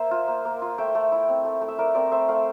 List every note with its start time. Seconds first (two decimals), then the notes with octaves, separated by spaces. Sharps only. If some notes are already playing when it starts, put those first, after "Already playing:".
Already playing: A#3 C5 E5
0.11 F4
0.28 A#3
0.45 A#3
0.62 F4
0.78 A3 E5 G5
0.95 A3
1.12 E4
1.28 C4
1.45 A3
1.61 A3
1.68 E5
1.78 E4 A#4 D5
1.95 C4 A#4 D5
2.11 A3 C5 E5
2.28 A3 D5 F5